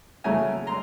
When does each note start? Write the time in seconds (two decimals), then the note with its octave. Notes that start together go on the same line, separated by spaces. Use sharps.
0.24 C#3 F#3 A3 C#4 E4 G#5 A#5
0.67 A#5 C6